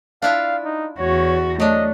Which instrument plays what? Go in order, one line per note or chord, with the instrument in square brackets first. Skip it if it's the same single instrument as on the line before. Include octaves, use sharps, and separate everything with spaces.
[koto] D4 E4 F4 [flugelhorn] F5
[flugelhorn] D#4
[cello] E2 F#4 [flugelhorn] C#5
[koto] F#3 D4 [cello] A3 [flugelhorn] D#5